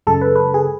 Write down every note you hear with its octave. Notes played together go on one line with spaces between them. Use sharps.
F#2 C#3 G#3 A4
B4
B4
G#4